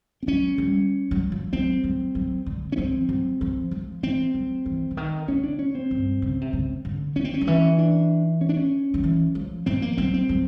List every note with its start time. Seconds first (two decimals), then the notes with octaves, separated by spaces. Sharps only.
0.23 C4
0.27 F#3 C#4
0.58 G3
1.11 F#3
1.32 F3
1.53 F#3 C4
1.84 F#3
2.15 F#3
2.46 D3
2.72 C#4
2.77 F3 C4
3.09 F#3
3.41 F3
3.71 F3
4.03 E3 C4
4.34 F#3
4.66 E3
4.91 D3
4.97 D#3
5.28 D3 C#4
5.44 D4
5.59 C#4
5.75 C4
5.91 G2
6.22 C#3
6.41 C3
6.53 C#3
6.85 D3
7.16 D#3 C#4
7.24 C4
7.34 C#4
7.41 D#3
7.47 E3 C#4
7.79 D4
8.41 C#4
8.49 D4
8.57 C#4
8.94 D#3
9.04 E3
9.35 F3
9.66 F3 C4
9.82 A#3
9.97 F#3 C4
10.14 C4
10.29 F#3